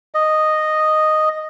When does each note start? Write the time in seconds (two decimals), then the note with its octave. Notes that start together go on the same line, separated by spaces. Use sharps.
0.14 D#5